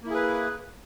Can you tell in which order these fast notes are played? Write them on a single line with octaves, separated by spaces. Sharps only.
A#3 E4 G#4 B4